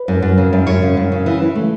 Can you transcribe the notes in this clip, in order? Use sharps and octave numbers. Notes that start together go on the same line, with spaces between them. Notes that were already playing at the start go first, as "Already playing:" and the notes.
Already playing: B4
F#2
F#2
C#3
F#2
F#2 C#5
C#3
F#2
C#3
E3
E3
A3